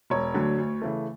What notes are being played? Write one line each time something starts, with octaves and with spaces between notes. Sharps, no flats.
E1 C#5
D2 D3 F#3
D2
C#3 E3 A3